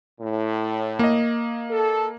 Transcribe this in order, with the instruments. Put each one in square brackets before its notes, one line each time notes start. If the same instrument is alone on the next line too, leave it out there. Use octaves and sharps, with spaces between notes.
[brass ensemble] A2
[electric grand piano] A#3 D#5
[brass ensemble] A4